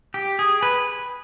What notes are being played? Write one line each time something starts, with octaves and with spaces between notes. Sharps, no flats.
G4
G#4
B4